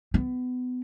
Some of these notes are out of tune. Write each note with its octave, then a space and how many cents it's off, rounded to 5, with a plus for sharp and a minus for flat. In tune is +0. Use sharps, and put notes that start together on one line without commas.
B3 +25